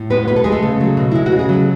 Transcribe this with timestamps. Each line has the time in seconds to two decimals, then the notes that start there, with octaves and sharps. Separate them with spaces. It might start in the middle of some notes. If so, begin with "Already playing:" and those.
Already playing: A2
0.10 G#3 B3 B4
0.28 B2 B4
0.36 A4
0.44 G#3 G#4
0.52 A3 A4
0.63 C#3
0.81 F#3
0.97 B2
1.12 G#3 E4
1.26 F#4
1.32 C#3
1.39 G#4
1.49 F#3 A4